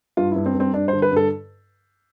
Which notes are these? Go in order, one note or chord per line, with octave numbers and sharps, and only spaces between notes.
G2 F4
G2 E4
C4
G2
C4
G2 D4
C5
D3
B4
G2 A4